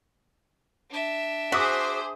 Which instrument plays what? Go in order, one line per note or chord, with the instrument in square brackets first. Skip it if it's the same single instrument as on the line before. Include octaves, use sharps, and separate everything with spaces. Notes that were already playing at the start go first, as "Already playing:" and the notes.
[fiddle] D4 E5
[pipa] F#4 [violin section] G#4 C5 [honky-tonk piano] D6 D#6 B6